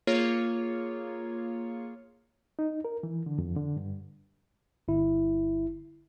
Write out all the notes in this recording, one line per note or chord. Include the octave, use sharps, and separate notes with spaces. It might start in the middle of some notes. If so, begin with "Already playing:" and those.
A#3 F4 G#4 C#5
D#4
A#4
E3
D3
F2
D3
G2
G1 E4